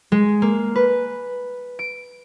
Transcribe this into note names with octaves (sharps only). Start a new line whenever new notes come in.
G#3
A#3
B4
D7